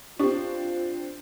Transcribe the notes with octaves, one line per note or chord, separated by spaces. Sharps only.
C4 D4 F4 G4 C#6